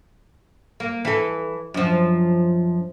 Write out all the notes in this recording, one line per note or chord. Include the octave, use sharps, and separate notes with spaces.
A#3
E3 A4
F#2 F3